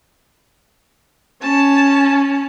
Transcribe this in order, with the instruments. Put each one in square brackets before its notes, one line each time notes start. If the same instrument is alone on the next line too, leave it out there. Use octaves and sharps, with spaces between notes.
[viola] C#4 [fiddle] A5